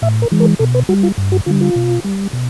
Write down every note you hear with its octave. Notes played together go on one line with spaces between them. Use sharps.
A2 E5
A#4
E3 G#3
A#4
B2 A4
B4
G3 F#4
F4
G2
F#4
D3 G3 F4
F4
B2
G3
B2